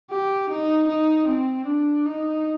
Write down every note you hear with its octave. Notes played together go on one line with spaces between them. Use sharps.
G4
D#4
D#4
C4
D4
D#4